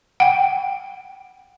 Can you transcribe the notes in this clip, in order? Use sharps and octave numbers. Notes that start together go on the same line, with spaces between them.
F#5 G5